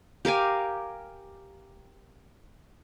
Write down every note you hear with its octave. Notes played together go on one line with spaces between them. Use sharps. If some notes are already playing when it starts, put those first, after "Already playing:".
G4 A#4 F5 G#5